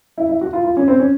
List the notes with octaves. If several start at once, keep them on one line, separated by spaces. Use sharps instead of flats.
E4
E4
F#4
F4
F4
C#4
C4
C#4